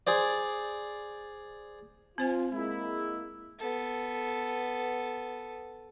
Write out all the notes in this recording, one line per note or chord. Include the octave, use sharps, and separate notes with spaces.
G#4 C5 D5
C4 F4 C5 G#5
G#3 A#3 E4
B3 A4